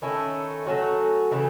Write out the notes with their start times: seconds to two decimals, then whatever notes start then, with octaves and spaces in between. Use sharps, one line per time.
0.02 D#3 A3 C#4 E4
0.66 F#3 A3 C#4 F#4
1.31 C#3 E3 A3